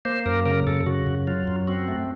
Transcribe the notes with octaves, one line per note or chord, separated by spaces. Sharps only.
A#3 C5
F#2 A#4
C#3 A#4
F#2 A4
C#3 F#4
F#2
F#3 F4
F#2
C4 F#4
A3